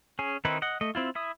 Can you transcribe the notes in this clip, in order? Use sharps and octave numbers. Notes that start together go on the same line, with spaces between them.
C#4 G#4
D#3 C4 D#4 E4 B4
D#5 F#5
A3 D#5
C4 E4 F4
E4 E5 D#6